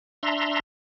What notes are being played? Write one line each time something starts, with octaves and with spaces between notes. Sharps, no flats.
D4 E5 A#5 C6